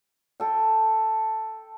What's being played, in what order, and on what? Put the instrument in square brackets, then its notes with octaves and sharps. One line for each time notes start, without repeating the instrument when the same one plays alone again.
[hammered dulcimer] A4 G5